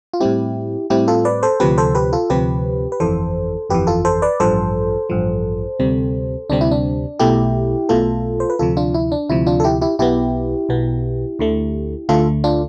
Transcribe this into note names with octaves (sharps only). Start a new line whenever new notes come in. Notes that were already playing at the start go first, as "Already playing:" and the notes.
F4
A2 G3 C4 E4 G4
A2 G3 C4 E4 G4
F4 A4
B4 D5
A4 C5
D2 C3 F3 C4 G4 B4
A4 C5
G4 B4
F4 A4
D2 C3 F3 C4 G4 B4
B4
G1 F2 E3 A4 C5
G1 F2 E3 G4 B4
F4 A4
A4 C5
B4 D5
A1 G2 F3 A4 C5
A1 G2 F3
D2 C3 G3 C4
D2 C3 G3 C4 D4
E4
D4
B1 B2 A3 E4 G4
B1 B2 A3 F4 A4
C5
B4
D2 C3 F3 F4 A4
D4 F4
E4
D4
D2 C3 F3 E4
D4 F4
A4
E4 G4
E4 G4
B1 B2 B3 E4 G4
B1 B2 B3
D2 D3 A3
D2 D3 A3 F4 A4
D4 F4